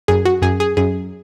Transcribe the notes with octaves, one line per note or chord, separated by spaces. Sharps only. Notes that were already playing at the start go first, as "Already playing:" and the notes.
F#2 G#4
F#4
F#2 G#4
G#4
F#2 G#4